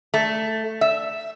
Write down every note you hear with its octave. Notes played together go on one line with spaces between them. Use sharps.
A3
E5